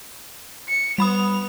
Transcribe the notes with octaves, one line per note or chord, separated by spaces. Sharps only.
C#7
G3 B3 B5 D#6 F7